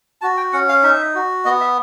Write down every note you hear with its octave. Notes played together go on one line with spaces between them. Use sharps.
F#4 A5
G5
C#4 F#5
F5
D#4 E5
F#4
B3 D#5
E5